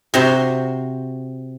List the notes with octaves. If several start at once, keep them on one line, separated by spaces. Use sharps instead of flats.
C3 F#4 C5 A#5 C6